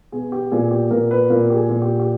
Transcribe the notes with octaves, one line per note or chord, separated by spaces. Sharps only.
B2 G#4
G4
A#2 G#4
G4
A#2 A#4
B4
A#2 A#4
G4
G#4
A#2
G4
G4